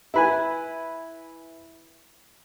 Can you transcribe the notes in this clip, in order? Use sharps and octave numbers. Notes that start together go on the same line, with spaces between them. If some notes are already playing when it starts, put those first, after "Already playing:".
E4 B4 G#5